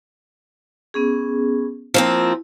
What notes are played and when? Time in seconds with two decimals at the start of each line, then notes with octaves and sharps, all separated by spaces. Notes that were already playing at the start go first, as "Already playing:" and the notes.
0.94 B3 C#4 G#4
1.94 F3 A#3 C4 E4